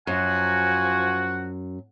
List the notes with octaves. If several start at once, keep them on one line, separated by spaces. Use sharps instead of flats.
F#2 F3 F#4 F#5 G#5